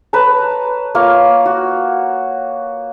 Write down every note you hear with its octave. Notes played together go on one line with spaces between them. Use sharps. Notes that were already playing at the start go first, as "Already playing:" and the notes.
B4 C#5 A5 A#5
A#3 F4 C#5 F5
F#4